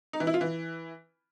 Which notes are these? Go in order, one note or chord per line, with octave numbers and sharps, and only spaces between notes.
D#4
E3
E4
F4
E3